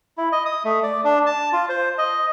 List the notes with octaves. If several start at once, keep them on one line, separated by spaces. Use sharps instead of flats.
E4
D#5
D#6
A3
D5
D4
A5
F4
C5
D#5